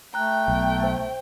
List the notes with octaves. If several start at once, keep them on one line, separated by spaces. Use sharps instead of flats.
A3 G5 A#5 F#6
B1
C5